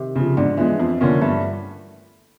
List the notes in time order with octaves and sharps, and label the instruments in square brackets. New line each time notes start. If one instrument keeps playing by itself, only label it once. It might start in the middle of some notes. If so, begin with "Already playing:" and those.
Already playing: [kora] C3 D#3
[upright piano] C#3 F3
[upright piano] G#2 [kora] D3
[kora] E3 [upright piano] F3 G#3
[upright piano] F2
D3 F3 A#3 C#4
[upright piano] G2 [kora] A3